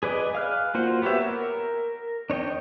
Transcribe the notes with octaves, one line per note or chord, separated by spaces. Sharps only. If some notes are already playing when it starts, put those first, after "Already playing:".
G#4 B4 D5 D#5 G#5
F5 F6 F#6
A#3 F4 F#4 C5 F#5
B3 G4 B4 C#5 E5
A#4
D4 C#5 D#5 G5